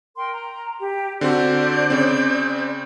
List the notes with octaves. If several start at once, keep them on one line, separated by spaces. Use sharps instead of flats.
A#4 G5 C6
A#5
G4
D3 C4 F#4 C5 D5 G6
C#3 C4